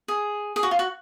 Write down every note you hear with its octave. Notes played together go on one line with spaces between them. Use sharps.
G#4
G#4
F#4
F4
F#4